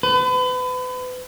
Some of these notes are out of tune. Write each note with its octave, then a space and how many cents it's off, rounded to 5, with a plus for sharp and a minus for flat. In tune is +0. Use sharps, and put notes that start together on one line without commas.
B4 +35